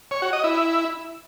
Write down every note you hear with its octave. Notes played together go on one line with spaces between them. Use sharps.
C#5
F#4
D#5
E4